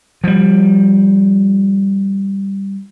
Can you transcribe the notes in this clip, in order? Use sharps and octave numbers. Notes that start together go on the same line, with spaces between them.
F3 G3